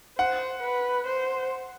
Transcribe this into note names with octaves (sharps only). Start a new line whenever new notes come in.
C5 F#5
B4
C5